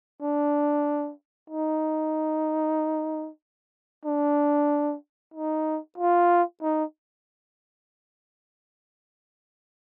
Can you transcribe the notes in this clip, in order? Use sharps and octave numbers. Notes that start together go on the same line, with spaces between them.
D4
D#4
D4
D#4
F4
D#4